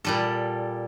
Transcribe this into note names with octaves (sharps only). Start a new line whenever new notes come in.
A#2 G3 A4